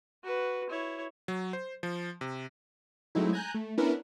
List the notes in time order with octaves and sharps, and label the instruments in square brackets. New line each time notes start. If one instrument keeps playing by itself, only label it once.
[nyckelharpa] F#4 B4
E4 C#5
[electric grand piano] F#3
C5
F3
C3
[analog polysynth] F#3 G#3 A3 C4 D#4 E4
G#5 A#5 F#6 G6
A3
B3 C#4 D4 E4 A#4 B4